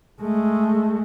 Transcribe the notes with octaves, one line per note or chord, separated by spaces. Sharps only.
G#3 A3